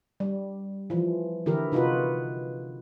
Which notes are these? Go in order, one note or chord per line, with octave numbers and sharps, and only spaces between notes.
G3
E3 F3
D3 E3 E4 G4 A#4
C3 D#4 F4 F#4 B4